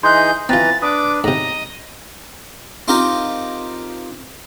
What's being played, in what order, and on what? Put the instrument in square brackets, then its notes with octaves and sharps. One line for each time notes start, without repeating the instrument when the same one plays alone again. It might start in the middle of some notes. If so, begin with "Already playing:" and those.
[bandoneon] E3 D#4 G#4 [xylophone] C6 D#6 F#6 [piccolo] G6
[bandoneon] E3 B4 A#5 [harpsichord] C4 F4 [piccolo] A6
[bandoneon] D4 B4 [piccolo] D6 [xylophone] D#6
[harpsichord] G#2 C3 [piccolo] D#5 [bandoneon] A#5
[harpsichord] C4 D#4 F4 G4 A#4 A#5